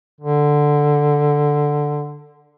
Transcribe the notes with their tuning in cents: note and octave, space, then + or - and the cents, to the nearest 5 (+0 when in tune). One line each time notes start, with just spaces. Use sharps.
D3 +5